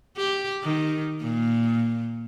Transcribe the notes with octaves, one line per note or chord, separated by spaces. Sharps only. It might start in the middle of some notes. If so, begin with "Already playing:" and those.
G4
D#3
A#2